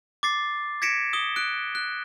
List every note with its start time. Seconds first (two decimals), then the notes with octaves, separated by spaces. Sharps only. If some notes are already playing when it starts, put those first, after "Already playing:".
0.23 D6 A6 C7
0.82 G#6 A#6 B6 C#7 D7 E7
1.13 D#6 G7
1.36 F#6 D7
1.75 F#6